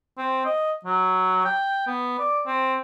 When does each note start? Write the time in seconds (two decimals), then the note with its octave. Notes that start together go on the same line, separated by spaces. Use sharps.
0.18 C4
0.45 D#5
0.85 F#3
1.45 G5
1.87 B3
2.19 D5
2.46 C4